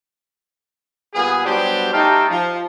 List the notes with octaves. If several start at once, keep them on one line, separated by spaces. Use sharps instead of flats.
A#2 G3 B3 G#4
F#3 G3 B3 D4 G4 C5
A3 D#4 G4 F5 G5 A5
F3